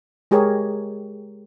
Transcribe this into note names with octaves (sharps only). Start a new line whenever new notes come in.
G#3 G4 G#4 A#4 C#5